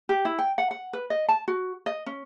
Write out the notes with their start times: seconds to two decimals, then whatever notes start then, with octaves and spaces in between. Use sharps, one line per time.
0.09 G4
0.25 E4
0.39 G5
0.58 F#5
0.71 F#5
0.93 B4
1.10 D#5
1.29 A5
1.48 F#4
1.86 D#5
2.06 C#4